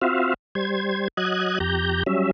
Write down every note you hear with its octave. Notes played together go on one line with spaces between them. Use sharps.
C4 F4 F#4 E5 F5
G3 C5 G#6
F#3 D#5 F#6 G#6
F2 G4 A#5 G6
F#3 G3 C#4 E5